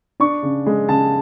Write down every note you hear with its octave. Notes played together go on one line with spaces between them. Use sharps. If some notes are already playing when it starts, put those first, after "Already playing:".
D4 C#6
C#3
G#3
C#3 A5